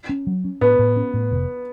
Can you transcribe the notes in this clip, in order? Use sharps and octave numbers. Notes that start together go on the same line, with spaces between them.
C#4
F#3
C#4
A2 B3
A2
C#4
A2
F1